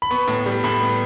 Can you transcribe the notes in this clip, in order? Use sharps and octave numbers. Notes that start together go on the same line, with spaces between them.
B5
B3 C#6
A2
G3
A2 B5
B3